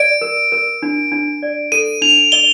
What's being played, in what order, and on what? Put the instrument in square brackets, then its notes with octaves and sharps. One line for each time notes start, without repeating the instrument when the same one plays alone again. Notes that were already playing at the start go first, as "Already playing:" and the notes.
Already playing: [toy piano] D5 [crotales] D7
[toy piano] A#4
A#4
D4
D4
D5
[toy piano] A4 [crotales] D#7
[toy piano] D4 [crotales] F7
[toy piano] D#5 [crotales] G7